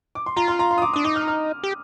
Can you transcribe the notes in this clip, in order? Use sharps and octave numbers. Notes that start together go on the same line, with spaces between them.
D6
C6
F4 A#5
C6
A#5
C6
D#6
D6
D4 D#6
D#4 D6
F6
F6
G4